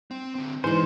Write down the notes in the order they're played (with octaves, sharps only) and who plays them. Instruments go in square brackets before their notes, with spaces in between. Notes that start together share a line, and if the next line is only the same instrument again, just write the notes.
[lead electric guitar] C4
D3 C4
[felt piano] G#2 E3 [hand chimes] B4 C6 [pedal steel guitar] C5 [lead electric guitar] D5 G#5